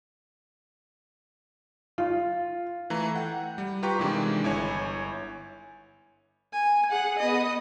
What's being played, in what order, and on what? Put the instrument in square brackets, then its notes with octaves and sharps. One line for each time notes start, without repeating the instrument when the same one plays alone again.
[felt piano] F4
[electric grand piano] E3 A3 A#5
F#5 G5
G3
F4 G4 B4 G5 A#5 C#6
C3 D#3 E3 G#3 D4
G1 E4 C#5 G#5
[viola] G#5
G#4 F#5
B3 D#5